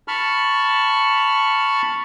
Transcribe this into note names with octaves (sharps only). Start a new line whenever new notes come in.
A5 B5 C#6 F6